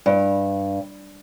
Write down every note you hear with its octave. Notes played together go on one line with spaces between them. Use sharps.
G2